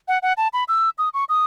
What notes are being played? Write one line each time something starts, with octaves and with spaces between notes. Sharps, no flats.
F#5
F#5
A5
B5
E6
D#6
C#6
D#6